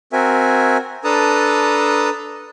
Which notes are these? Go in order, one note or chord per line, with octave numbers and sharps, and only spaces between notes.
C4 F#4 A#4 E5 G#5
D4 A4 B4 A5 A#5 D#6